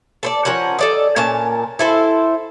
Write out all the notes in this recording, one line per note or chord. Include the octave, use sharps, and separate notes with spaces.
A4 C5 D5
F3 C#4 A#4 F#5
A4 D5 D#5
A#2 C#4 A#4 A5
E4 A4 C5